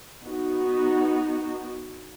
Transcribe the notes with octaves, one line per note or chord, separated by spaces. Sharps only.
B3 D#4 F#4